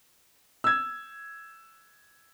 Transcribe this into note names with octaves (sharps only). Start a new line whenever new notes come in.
E6 G#6